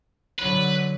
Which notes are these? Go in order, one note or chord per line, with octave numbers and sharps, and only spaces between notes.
D3 F#3 B4